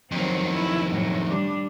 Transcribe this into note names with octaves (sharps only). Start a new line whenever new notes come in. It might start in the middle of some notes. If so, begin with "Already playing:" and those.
F2 D#3 F#3 C4
E4
A2 F#3
G3 D4